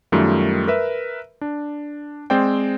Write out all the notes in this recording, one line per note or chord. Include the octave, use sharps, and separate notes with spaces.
F#2 D#3 G3 A3 F4
A#4 B4 E5
D4
G#3 C4 C5 D5 G5